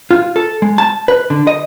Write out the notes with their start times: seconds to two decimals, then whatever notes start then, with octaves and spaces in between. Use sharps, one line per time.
0.11 F4
0.36 A4
0.62 G#3
0.78 A5
1.08 B4
1.30 D3
1.47 D#5